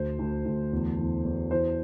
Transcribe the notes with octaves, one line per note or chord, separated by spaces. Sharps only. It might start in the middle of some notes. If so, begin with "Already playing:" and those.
Already playing: D2 C5
D2
D2
E2
E2
E2
E3 C5